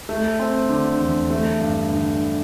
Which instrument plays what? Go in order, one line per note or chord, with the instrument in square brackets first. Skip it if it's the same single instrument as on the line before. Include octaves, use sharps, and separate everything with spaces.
[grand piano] A3
C4
D3
E2
A3
G2
D3